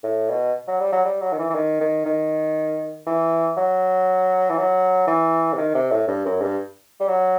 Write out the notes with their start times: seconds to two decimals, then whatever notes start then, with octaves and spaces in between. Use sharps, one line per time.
0.04 A2
0.29 B2
0.68 F#3
0.80 G3
0.92 F#3
1.05 G3
1.21 F#3
1.33 D#3
1.39 E3
1.50 E3
1.55 D#3
1.81 D#3
2.06 D#3
3.07 E3
3.57 F#3
4.50 E3
4.58 F#3
5.07 E3
5.53 C3
5.58 D#3
5.75 C3
5.92 A2
6.08 G2
6.25 F#2
6.42 G2
7.00 G3
7.08 F#3